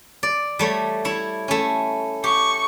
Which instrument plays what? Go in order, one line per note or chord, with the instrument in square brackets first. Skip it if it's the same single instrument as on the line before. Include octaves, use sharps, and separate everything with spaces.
[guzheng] D5
G3 A3 C#5
E4 C#5
A3 C#4
[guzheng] G4 [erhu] C#6